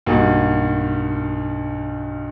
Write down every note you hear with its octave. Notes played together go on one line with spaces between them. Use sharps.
B1 G2 A#3 F#4